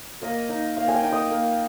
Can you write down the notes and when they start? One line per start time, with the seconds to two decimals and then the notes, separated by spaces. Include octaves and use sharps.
0.22 A#3 D#5
0.49 D#4
0.77 A#3 F5
0.88 G#5
0.94 G5
1.03 D#4
1.12 D#6
1.31 A#3